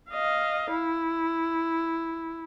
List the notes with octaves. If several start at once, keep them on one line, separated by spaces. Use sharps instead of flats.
D#5 F5
E4